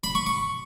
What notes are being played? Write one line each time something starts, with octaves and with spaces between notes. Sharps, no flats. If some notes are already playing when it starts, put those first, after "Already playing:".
B5
C#6
C#6